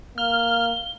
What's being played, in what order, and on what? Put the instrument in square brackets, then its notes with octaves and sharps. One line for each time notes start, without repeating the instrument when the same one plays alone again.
[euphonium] A#3 [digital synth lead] F6 [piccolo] G7